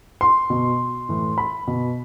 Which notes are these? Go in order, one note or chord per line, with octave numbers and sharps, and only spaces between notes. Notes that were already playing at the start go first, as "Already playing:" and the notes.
C6
B2
A2 E3
B5
B2